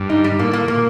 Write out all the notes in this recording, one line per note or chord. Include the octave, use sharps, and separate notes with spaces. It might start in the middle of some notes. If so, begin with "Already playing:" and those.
Already playing: G2
D#4
G3
A2 A#3
A#3
A#2 A#3